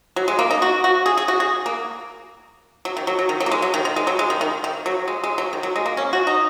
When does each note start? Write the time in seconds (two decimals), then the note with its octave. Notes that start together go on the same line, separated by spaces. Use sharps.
0.16 F#3
0.28 G#3
0.39 A#3
0.51 D#4
0.62 F#4
0.84 F#4
1.06 G#4
1.17 G#4
1.28 F#4
1.40 G#4
1.66 A#3
2.85 F#3
2.97 D#3
3.07 F#3
3.19 F#3
3.29 D#3
3.40 F#3
3.46 A#3
3.51 G#3
3.62 F#3
3.74 D#3
3.85 D#3
3.96 G#3
4.07 F#3
4.19 G#3
4.30 D#3
4.41 D#3
4.64 D#3
4.86 F#3
5.08 G#3
5.24 G#3
5.38 F#3
5.53 D#3
5.63 F#3
5.76 G#3
5.86 A#3
5.97 C#4
6.13 F#4
6.27 D#4